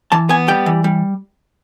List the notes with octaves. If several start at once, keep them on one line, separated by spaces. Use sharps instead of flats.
E3 A5
B3 G#5
G3 G5
E3
G3